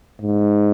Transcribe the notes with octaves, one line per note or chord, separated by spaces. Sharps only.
G#2